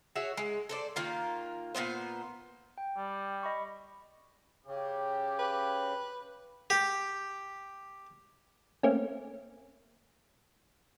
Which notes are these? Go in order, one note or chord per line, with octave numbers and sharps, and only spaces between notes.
F#4 G#4 C#5 E5
G#3
A4 C5 D5
D#3 A#3 F4
A#2 D#3 B3 C5
G5
G3
D#5 B5 C#6
C#3 G4
B4
G4
A3 A#3 C4 C#4